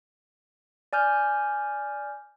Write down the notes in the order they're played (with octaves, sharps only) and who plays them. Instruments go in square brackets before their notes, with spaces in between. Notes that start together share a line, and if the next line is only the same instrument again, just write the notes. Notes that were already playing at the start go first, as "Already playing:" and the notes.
[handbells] D5 G#5 F6 G6